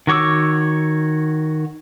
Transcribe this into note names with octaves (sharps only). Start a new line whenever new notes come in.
D#3 F#4 C#5 D6 E6